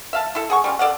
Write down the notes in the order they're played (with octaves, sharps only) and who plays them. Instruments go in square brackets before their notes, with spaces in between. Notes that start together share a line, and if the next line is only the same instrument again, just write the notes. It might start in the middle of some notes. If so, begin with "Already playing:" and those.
[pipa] E5 F5 A5
E4 A4
G#4 F#5 C#6
G3 C#4 F4
A4 D5 F5 F#5